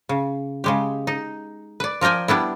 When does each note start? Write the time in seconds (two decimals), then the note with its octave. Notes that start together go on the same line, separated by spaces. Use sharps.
0.09 C#3
0.64 C#3 G#3 G4
1.07 D#4
1.80 B4 D5
2.01 F3 A#4 D5 G5 G#5
2.28 G3 B3 D4 E4